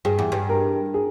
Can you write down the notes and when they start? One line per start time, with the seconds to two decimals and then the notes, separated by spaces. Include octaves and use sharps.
0.05 G2 G#4
0.19 E2
0.32 G2
0.49 A#4
0.94 G#4